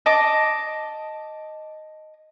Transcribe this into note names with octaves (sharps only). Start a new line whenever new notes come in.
D#5 A5 D6